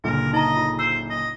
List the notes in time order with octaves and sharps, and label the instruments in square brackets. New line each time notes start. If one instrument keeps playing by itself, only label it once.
[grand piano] F#1 A#2 D3 [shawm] A#4
[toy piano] D#4 F5 A#5 [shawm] D#5
[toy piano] F4
[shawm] C5 [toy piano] E6
[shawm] D#5